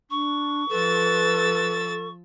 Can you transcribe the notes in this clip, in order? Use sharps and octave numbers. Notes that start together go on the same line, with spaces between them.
D4 C#6
F3 A4 B4 E6 A6